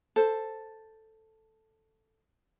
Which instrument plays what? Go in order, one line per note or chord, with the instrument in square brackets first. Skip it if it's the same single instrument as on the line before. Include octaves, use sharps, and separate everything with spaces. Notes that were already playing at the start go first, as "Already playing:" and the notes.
[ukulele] A4 C5